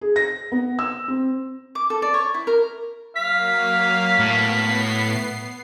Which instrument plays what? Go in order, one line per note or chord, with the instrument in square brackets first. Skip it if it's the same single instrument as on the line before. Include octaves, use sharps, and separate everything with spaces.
[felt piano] G#4
A#6
B3
E6
C4
[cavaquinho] D6
A4
D5
C#5
E4
A#4
[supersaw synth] F#3 A#3 [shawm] F5 [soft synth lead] B6
[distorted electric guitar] A2 [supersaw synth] B3 C7